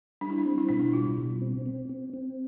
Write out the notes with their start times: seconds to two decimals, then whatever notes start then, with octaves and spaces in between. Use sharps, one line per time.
0.21 G3 D4
0.30 E4
0.38 D4
0.45 C4
0.58 E4
0.69 B2 D4
0.79 E4
0.93 G3 F4
1.18 B2
1.42 C4
1.66 C4
1.89 C4
2.14 C4